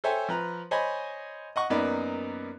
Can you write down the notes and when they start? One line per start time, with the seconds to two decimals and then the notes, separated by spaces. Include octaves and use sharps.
0.04 A4 C5 C#5 E5 G5 G#5
0.29 F3 B4 A#5
0.71 C5 C#5 D#5 G#5 B5
1.56 D#5 F#5 C#6
1.70 F#2 A#3 B3 D#4 D5 B5